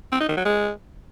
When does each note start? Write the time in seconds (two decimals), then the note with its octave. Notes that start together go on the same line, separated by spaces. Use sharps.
0.12 C4
0.21 D#4
0.29 D#3
0.37 F#3
0.45 G#3